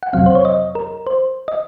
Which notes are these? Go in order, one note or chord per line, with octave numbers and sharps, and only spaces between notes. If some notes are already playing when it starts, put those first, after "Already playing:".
F#5
F2 C3 F#3 C4 F5
C5
C#5
D#5
A#4
C5
D#5